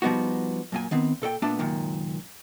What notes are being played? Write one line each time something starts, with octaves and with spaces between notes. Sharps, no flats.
F3 G3 B3 D#4 F#4
F#2 A#2 G#5
D#3 B3 C4
A#2 A4 D#5 G5
A#2 A3 B3 D4 A5
C#2 F#2 A#2 D#3